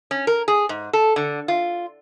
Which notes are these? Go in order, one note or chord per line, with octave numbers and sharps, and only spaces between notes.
C#4
A#4
G#4
G#2
A4
D3
F4